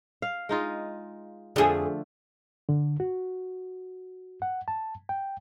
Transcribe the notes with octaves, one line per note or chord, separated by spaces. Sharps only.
F5
G#3 D#4 F4
F2 D3 F3 A3 G#4
D3
F#4
F#5
A5
G5